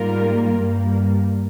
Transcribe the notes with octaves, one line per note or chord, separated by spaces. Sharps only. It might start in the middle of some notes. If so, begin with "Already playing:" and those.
Already playing: G#2 G3 A#3 F4 A#4
G2 G3 A#3